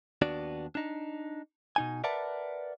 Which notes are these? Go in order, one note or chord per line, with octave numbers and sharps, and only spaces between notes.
D#2 B3 D4 F#4 D5
D4 D#4
B2 D#4 G#5
A#4 B4 D5 E5 F#5 A5